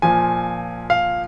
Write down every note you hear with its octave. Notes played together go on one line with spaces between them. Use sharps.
A#2 F3 G#5
F5